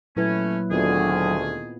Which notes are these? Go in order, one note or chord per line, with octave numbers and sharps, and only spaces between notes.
A#2 F#3 A3 C#4 E4 B4
D2 D#3 B3 C4 F4 G#4